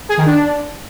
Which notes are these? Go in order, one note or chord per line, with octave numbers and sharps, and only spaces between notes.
G#4
D#3
D4